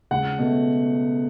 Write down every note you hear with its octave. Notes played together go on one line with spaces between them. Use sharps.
C#2 F#5
B2 A3